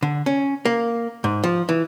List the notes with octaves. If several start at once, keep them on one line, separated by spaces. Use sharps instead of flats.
D3
C#4
A#3
G#2
F3
E3